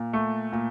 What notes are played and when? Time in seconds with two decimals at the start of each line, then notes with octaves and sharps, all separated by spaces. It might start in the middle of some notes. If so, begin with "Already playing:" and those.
Already playing: A#2
0.13 A3
0.52 A#2